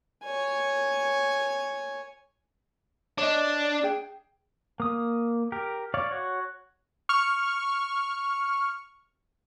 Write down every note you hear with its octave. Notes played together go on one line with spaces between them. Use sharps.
C#5 G#5
D4 C#5 D#5
G#4 G5
A#3 D#6
G4 A#4
C#5 D5 F5
F#4 C#5
C#6 F6